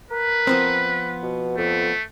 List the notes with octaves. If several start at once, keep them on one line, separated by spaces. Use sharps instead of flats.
A#4 B4
F3 B3 C4
B2
F2 A3